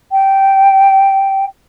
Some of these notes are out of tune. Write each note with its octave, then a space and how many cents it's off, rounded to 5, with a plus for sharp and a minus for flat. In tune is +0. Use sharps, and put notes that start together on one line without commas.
G5 -10